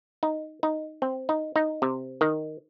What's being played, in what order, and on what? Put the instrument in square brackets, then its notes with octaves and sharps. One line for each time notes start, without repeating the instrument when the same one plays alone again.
[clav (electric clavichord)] D#4
D#4
C4
D#4
D#4
C3
D#3